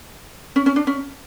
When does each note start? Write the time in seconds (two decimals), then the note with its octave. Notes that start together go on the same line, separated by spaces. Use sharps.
0.56 C#4
0.66 C#4
0.76 D4
0.87 C#4